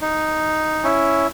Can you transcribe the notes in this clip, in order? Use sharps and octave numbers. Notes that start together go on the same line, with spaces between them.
D#4
C#4 E4